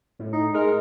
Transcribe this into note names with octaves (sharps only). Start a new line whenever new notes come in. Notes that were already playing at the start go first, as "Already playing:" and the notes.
A2
D#4
G#3 A#4